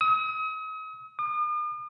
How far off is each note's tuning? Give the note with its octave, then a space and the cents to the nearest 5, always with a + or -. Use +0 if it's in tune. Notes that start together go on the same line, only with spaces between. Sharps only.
D#6 +40
D#6 -45